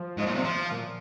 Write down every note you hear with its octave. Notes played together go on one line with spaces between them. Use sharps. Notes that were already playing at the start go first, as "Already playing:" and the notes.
Already playing: F3
G#2
A#2
C3
F3
A#2